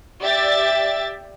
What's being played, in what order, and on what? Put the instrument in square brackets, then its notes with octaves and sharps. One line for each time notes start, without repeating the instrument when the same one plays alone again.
[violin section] G4 D5 E5 A6